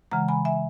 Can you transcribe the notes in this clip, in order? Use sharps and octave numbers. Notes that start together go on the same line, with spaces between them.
C#3 E3 G#3 F#5 A#5
G#5 B5
E5 G#5